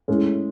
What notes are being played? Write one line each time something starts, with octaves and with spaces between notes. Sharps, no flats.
A2 G#3 C#4